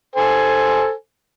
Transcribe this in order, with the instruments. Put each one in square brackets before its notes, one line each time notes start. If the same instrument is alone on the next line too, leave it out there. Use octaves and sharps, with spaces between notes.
[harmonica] A4 C5 G#5